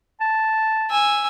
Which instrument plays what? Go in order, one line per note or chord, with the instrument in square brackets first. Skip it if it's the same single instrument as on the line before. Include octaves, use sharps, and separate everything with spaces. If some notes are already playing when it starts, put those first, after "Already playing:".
[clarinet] A5
[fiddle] G#5 E6